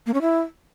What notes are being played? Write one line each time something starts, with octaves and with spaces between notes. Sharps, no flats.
A#3
C#4
E4